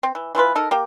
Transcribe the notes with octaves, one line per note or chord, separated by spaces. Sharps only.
C4
E3
E3 A3 F4 B4
D#4 A4 A#4
A#3 G4